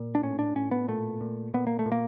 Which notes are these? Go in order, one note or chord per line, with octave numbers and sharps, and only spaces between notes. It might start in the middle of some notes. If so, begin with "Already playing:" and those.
Already playing: A#2
D4
A2 C#4
D4
A2 C#4
B3
A#2 A3
A#2
A#2 B3
A#3
A3
A#2
A#3